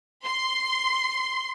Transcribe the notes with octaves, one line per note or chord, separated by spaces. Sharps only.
C6